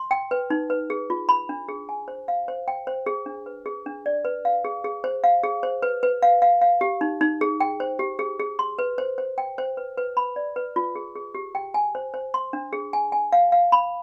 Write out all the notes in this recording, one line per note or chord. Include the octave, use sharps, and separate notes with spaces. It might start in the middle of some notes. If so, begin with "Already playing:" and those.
Already playing: C6
G5
B4
D#4
B4
G#4
F4
B5
D4
G#4
G#5
C5
F5
C5
G5
C5
G#4
D4
B4
G#4
D4
D5
B4
F5
G#4
G#4
C5
F5
G#4
C5
B4
B4
F5
F5
F5
G4
D#4
D#4
G#4
G5
C5
G4
G#4
G#4
C6
B4
C5
C5
G5
C5
B4
B4
B5
D5
B4
F4
G#4
G#4
G4
G5
G#5
C5
C5
C6
D4
G#4
G#5
G#5
F5
F5
B5